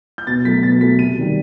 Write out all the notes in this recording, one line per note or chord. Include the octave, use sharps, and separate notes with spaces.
G6
B2 A6
F#3 A3 B6
B2 A6
F#3 A3 B6
C3 D#7
D#3 G3